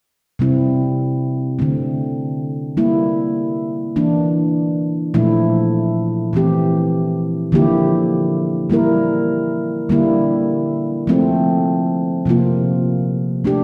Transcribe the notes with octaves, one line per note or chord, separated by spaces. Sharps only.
C3 G3 C4 E4
D3 A3 C4
G3 A#3 E4
E3 A#3 D4
A#2 F3 A3 E4
E3 A3 C4 G4
D3 F3 A#3 E4 G4
G3 A#3 E4 A#4
D3 G3 A#3 E4
F3 A3 C4
C3 F3 A#3 F4
A3 D4 G4